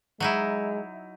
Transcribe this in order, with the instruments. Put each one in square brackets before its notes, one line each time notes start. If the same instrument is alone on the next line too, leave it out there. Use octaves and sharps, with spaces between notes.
[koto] F#3 D#4 E4 [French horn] G#3